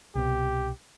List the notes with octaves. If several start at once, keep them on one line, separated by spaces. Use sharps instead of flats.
C2 B2 G4